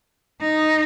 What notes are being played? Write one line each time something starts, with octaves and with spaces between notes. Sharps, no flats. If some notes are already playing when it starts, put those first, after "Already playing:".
D#4